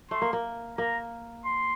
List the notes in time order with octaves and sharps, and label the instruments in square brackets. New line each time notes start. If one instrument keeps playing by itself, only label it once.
[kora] A3 [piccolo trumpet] C6
[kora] A#3
A#3
[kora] A#3 [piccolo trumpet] A#5
[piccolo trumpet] C6